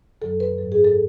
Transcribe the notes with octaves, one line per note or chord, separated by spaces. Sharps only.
F#2 D3 F#3 A4
B4
G#2 F#3 A4
G#4
A4